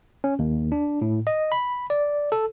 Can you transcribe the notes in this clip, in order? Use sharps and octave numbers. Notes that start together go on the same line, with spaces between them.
C#4
D#2
D4
A2
D#5
B5
D5
A4